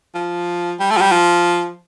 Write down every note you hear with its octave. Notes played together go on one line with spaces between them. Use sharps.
F3
G3
A3
F3
G3
F3